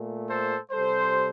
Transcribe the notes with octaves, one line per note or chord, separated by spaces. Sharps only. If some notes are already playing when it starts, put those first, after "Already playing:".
Already playing: A#2 A3
A4 C5
C3 G3 A4 C5